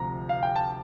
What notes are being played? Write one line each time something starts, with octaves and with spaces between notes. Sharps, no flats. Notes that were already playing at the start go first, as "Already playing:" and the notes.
Already playing: D2 C3 F3 A#5
F5
G5
A5